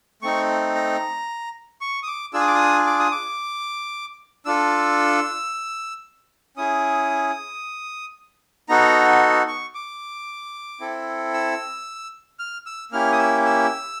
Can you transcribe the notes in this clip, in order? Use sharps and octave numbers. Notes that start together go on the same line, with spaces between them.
A3 C4 D#4 C#6
A#5
C#6
D#6
D6
D4 F4 G#4 E6
D#6
D6
D#6
D6
D#6
D6
D4 F4 A4 E6
C#4 E4 G#4 D#6
B3 D#4 F#4 A4 A#5
C#6
D6
C4 E4 A4
E6
F6
E6
A#3 C#4 E4 G4 F6
D#6
E6
E6